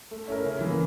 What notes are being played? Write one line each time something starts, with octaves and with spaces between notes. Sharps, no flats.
A3
C#4 E4 A#4
C#3
E3 A#3